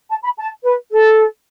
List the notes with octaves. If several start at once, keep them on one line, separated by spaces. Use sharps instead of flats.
A5
B5
A5
B4
A4